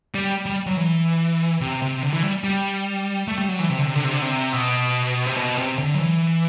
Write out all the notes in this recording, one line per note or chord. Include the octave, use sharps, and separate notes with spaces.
G3
G3
F#3
E3
C3
C3
D3
E3
G3
G3
A3
G3
F#3
E3
C3
D3
C3
D3
C3
D3
C3
B2
C3
B2
C3
D3
F#3
E3